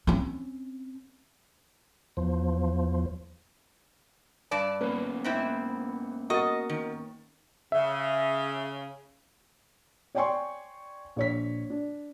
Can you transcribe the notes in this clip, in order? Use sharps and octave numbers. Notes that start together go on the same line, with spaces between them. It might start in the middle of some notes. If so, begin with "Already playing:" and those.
C4 C#4
E2 F3
G2 D5 A5
A#3 B3 C#4 B4
G#2 C4 E4
F#4 A#4 D#5 C#6 D#6 A6
D#3
C#3 E5
C#5 D5 G5 G#5 C6 C#6
A#1 C#5 B6
D4